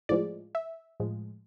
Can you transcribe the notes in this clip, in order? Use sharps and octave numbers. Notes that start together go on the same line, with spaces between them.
A2 F3 G#3 D5
E5
A2 F3 G#3